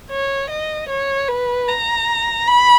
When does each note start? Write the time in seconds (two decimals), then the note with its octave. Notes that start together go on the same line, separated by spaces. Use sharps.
0.11 C#5
0.51 D#5
0.90 C#5
1.29 B4
1.69 A#5
2.48 B5